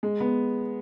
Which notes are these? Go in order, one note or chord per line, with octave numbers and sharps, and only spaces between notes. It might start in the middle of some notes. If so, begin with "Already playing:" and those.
G#3
B3